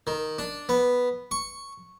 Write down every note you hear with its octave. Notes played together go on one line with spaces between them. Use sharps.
D#3
D4
B3
C#6